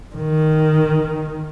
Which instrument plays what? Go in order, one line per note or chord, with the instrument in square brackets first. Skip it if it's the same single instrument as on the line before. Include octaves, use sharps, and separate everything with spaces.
[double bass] D#3